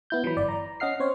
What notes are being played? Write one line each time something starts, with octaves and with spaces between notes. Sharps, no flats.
B3 E4 G6
E3 F#3 B5
G1 D5
A#5
C#4 D#5 F#5 F6 C7
C4 C5 C#5